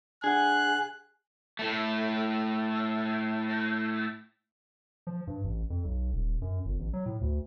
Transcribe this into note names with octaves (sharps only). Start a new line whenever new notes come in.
D4 G#4 F#5 G#5 F#6
A2 A3
F3
G2
A1
F2
B1
D#1
F#2
G1
A1
F#3
A2
D2